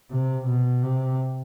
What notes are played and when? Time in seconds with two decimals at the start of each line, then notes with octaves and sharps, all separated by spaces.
0.12 C3
0.47 B2
0.83 C3